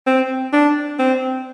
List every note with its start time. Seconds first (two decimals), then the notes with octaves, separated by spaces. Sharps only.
0.06 C4
0.53 D4
0.99 C4